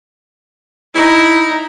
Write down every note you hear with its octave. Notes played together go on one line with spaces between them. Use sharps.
D#4 E4